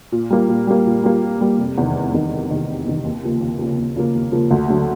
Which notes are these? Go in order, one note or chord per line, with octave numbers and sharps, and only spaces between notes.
A#2
G3 A#3
A#2
G3 A#3
A#2
G3 A#3
A#2
G3 A#3
F1
E2 C3 D#3
F1
E2 C3 D#3
F1
E2 C3 D#3
F1
E2 C3 D#3
D#2
C#3 F3 A#3
D#2
C#3 F3 A#3
D#2
C#3 F3 A#3
D#2
C#3 F3 A#3
D2
D3 F#3 A3